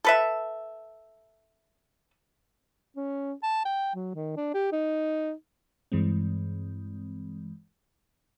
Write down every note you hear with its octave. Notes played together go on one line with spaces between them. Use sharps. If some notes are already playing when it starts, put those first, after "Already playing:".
A4 B4 E5
C#4
A5
G5
F#3
D#3
D4
G4
D#4
G2 E3 G#3 C4